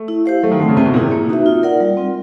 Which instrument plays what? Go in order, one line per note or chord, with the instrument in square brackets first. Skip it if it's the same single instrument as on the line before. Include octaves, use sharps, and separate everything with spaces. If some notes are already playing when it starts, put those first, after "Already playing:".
Already playing: [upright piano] A3
[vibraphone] E4
G4 C5 F5
[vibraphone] F#3 [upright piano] A3
[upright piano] D#3
[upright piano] D3 [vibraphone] A3 C4
[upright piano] C#3
[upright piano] C3 [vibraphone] C4
[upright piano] B2
[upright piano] A#2 [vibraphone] E4 G#4
[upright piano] C3
[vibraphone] A#3
D#4 F#4 B4 E5
F4
A#4 D5 F#5
G3
C4 F4